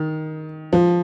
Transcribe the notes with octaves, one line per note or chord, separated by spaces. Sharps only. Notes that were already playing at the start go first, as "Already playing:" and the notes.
Already playing: D#3
F3